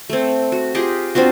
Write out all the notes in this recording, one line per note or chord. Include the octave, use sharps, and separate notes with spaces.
A3 C4
F#4
F4 G4 G#4 D#5
C4 D4 F4 F#4